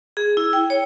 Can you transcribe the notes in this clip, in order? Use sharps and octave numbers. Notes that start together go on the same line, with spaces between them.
G#4
E4
G5
C#5